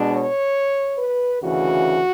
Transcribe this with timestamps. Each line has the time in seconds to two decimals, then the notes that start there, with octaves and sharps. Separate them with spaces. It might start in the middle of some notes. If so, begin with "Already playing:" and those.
Already playing: B2 G#3 D4
0.10 C#5
0.98 B4
1.42 D2 C#3 E3 F#4